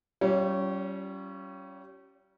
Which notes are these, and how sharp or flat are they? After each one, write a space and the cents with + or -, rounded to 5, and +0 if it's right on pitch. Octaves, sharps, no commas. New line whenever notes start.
G3 -35 C#4 +0 F4 -30